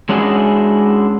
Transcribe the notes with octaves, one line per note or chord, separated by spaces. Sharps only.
G#3 C#4 D4 E4 F#4 G#4